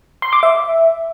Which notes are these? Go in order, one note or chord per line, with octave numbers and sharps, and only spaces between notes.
C6
D6
E5